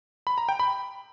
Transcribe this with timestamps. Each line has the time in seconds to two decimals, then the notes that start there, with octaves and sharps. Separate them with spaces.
0.27 B5
0.38 A#5
0.49 G5
0.59 B5